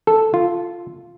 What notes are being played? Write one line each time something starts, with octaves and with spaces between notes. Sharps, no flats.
A4
F4